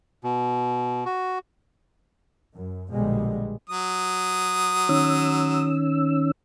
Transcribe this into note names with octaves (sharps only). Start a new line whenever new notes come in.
B2
F#4
F#2
A#1 B2 D3 F3 G3 G#3
F#3 D#6
D#3 C#4 E6